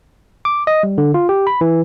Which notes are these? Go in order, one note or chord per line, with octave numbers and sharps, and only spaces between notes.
D6
D#5
G3
D3
F4
G4
B5
E3